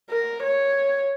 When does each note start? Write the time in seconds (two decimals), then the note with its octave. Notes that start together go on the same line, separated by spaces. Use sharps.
0.10 A#4
0.43 C#5